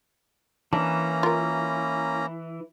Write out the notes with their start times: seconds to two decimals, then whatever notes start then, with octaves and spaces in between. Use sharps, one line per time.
0.73 E3 A#3 C#4 D4 A#5
1.23 F4 A#4